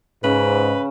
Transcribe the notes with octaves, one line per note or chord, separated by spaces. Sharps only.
G#2 C#3 B4